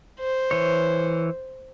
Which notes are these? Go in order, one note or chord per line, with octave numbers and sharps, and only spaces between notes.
C5
E3 C#5